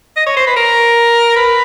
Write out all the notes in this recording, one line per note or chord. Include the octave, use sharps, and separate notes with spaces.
D#5
C#5
C5
B4
A#4
B4